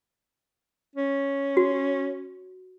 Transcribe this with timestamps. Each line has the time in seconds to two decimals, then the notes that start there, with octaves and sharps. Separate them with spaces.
0.96 C#4
1.57 F#4